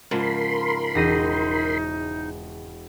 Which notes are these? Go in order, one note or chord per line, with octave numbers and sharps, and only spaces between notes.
G#2 C#3 F3 A#4 B5 C6
E1 D#4 A#6 D#7